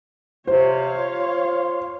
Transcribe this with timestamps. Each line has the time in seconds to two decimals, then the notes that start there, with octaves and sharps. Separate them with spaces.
0.47 C3 C5 C#5 F5
0.97 F4